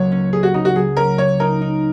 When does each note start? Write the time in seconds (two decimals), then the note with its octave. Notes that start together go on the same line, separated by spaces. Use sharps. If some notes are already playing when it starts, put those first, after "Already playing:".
Already playing: C#2 F#3 A#3 C#5
0.12 C#4
0.33 C#4 G#4
0.43 F#4
0.54 C#3 D#4
0.65 F#4
0.75 F#3 G#4
0.97 C#4 A#4
1.18 A#3 C#5
1.40 D#4 A#4
1.61 D#4